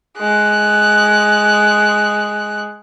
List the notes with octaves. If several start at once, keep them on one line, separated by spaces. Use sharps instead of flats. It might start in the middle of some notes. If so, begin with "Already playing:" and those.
G#3 F#6